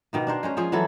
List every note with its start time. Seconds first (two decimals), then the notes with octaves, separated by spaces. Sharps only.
0.13 B2 D#3 A#3
0.27 D4 A#4 C5
0.43 G#3 C#4 C5
0.57 F3 G#4 C5
0.72 E3 F#3 E4 A4